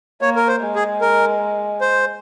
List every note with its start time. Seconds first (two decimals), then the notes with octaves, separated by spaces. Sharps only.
0.22 A#3 C#5
0.36 A#4
0.48 C5
0.62 G#3
0.76 G#4
1.01 A#4
1.81 C5